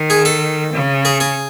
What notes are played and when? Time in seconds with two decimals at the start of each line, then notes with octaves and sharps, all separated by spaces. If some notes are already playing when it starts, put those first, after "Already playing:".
Already playing: D#3
0.10 G#4
0.25 A4
0.73 C#3
1.05 G#4
1.20 G#4